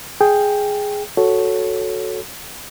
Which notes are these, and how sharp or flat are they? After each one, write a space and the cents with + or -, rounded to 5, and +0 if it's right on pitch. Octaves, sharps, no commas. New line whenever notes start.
G#4 +0 G5 +5
F#4 +0 A4 +0 C#5 +0